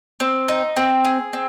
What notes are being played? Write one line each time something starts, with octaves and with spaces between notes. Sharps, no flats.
C4
D#4
C4
G#4
C4